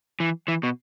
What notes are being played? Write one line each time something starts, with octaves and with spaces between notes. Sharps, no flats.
E3
E3
B2